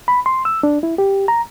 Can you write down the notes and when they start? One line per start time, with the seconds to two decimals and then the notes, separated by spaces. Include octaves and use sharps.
0.08 B5
0.26 C6
0.45 E6
0.63 D4
0.83 E4
0.98 G4
1.28 A#5